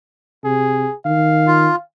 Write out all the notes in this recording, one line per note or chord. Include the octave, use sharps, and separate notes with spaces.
C3 G#4
D#3 F5
F4